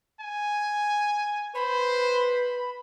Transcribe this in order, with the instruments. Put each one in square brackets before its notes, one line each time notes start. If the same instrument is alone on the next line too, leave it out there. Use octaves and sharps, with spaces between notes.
[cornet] G#5
[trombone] B4 [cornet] C5 [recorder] B5